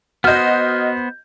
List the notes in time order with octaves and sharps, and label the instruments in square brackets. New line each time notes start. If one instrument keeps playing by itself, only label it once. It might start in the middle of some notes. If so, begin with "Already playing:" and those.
[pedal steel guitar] B3 C5 [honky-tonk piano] F#4 D#5 [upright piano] F6 G6